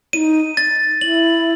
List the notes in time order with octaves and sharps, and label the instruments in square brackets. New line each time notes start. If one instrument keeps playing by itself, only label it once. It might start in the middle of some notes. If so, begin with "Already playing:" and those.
[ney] E4 [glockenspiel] D#7
[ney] D#4
[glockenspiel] A6
[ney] E4 [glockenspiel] F#7